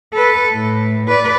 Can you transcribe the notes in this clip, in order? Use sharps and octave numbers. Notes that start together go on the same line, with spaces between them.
A4 B4
A2
B4 D5